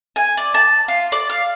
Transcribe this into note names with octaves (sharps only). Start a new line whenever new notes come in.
G#5
D5
A5
F4
D5
F5